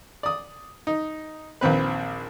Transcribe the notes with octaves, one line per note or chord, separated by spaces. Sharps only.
D5 D#6
D#4
A#1 D#2 C4 B4